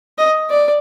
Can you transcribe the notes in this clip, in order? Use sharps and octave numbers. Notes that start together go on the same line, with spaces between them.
D#5
D5